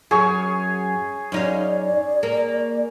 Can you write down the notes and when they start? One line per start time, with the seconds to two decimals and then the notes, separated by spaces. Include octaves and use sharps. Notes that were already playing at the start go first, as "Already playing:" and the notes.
0.11 F#2 G#4 C#5
1.32 F#2 D#4 D5 F5
2.23 A#3